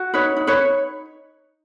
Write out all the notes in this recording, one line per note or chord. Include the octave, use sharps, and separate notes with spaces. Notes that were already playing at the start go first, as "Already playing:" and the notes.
Already playing: F#4
D#4 B4 C#5
D#4
B4 C#5
D#4